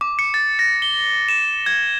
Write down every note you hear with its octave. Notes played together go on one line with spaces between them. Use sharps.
D6
C#7
A6
A#6
G7
E7
G#6